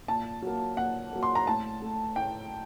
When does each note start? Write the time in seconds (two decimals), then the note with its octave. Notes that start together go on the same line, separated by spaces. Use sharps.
0.08 A#2 A5
0.42 F#3 A#3
0.77 A#2 F#5
1.13 F#3 A#3
1.23 C6
1.35 A#5
1.47 A2 A5
1.82 A3
2.16 A2 G5